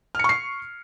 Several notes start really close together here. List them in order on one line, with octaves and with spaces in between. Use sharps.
F6 C#7 C#6 C7